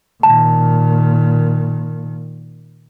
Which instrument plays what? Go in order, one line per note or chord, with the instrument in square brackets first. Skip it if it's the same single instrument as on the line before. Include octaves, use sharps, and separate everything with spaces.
[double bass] A#2 D#3 [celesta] A5